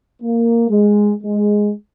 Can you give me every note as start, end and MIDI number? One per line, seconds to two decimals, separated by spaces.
0.22 0.65 58
0.69 1.12 56
1.23 1.72 56